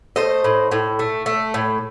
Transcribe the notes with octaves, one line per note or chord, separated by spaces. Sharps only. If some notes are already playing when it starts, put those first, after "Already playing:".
A3 C5 D#5
A2
A2
A3
A3
A2